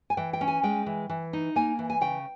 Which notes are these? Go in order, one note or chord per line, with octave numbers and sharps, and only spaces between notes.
G#5
E3 G5
G5
C#4
G#5
G#3 G5
E3
E3
D#4
A#3 G#5
E3
G#5
C#3 G5